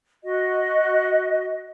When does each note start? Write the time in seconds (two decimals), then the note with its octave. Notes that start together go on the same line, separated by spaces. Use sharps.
0.24 F#4 D#5